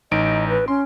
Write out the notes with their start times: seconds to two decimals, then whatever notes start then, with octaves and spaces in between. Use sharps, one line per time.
0.11 A1 D#4 D#5 D7
0.48 B4
0.68 C#4 C6